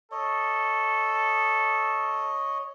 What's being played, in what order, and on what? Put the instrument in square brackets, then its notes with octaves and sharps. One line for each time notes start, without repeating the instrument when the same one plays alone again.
[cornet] A4 [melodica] C#5 D#5